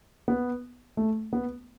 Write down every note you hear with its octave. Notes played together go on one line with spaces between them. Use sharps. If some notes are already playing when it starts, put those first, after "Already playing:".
B3
A3
B3